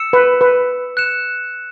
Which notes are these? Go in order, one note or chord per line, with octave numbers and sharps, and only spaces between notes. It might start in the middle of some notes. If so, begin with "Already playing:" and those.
Already playing: E6 C#7 E7
B4
B4
F#6 C#7 E7